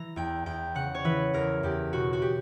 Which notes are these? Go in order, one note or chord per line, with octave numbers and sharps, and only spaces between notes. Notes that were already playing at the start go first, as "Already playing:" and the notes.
Already playing: E3 A#5
E2 G5
E2 G5
C#3 F#5
C#5
E3 B4
E2 A#4
E2 G4
B2 F#4
F#4
G4